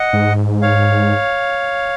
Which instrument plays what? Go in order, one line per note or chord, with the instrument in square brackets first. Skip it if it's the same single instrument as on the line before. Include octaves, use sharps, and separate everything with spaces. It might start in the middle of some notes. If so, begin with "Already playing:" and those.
Already playing: [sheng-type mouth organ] D#5 F#5
[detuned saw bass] G#2
[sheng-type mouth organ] C#5 F5